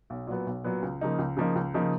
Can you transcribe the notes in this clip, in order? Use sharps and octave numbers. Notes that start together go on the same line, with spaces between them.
B1
A#2 F#3 B3
B1
A#2 F#3 B3
C#2
C#3 F3 A#3 D#4
C#2
C#3 F3 A#3 D#4
C#2
C#3 F3 A#3 D#4